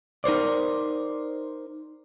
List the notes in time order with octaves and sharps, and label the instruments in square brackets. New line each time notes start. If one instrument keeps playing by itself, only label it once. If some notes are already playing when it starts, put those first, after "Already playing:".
[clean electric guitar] D#4 A#4 C5 D5